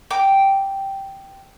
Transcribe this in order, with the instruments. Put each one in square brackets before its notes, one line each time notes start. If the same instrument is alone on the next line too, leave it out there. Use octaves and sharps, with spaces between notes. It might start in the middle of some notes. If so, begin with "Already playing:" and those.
[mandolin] G5 A#5 D6